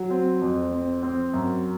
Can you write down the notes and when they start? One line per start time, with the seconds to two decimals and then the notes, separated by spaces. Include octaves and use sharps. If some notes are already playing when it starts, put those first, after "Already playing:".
Already playing: F#3
0.10 C4
0.41 F2
0.71 C4
1.03 C4
1.34 F#2